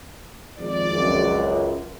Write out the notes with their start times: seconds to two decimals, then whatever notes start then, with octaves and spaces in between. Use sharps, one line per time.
0.58 G#1 F2 D5
0.92 C#2 F#2